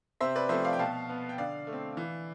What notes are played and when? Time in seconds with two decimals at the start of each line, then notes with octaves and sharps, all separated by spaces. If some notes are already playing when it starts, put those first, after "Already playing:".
0.21 C3 C5 E5
0.36 B4 D5
0.49 F3 A3 C4 C5 E5
0.64 D5 F5
0.73 G5
0.79 B2 F5 A5
1.09 B3
1.29 G5
1.38 D3 D5 F5
1.67 A3
1.73 C4
1.97 E3